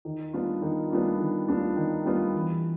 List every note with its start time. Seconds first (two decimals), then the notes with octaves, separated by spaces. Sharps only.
0.05 D#3
0.33 G3 B3 D4 F4
0.62 D#3
0.91 G3 B3 D4 F4
1.20 D#3
1.48 G3 B3 D4 F4
1.77 D#3
2.06 G3 B3 D4 F4
2.35 E3